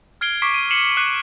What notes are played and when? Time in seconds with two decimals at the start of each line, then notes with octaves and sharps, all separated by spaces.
0.21 F6 G#6 C7 D7 G7
0.42 C#6 D6 B6 C7 D7
0.54 D#7
0.71 C7 C#7 E7 F#7
0.97 D6 F#6 C7 D#7